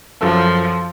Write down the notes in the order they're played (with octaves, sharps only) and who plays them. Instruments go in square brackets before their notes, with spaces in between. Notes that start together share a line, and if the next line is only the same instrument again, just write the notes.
[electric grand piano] F#2 A4 A5 [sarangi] F3